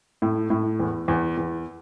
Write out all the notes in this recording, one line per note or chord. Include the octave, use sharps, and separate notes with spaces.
A2
A2
E2
E2
E2